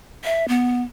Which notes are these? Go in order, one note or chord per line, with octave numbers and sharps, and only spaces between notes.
E5
B3